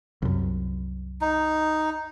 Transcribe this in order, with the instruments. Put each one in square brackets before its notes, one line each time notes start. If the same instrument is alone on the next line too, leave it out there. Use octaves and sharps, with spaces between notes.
[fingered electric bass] C2 F#2
[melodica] D#4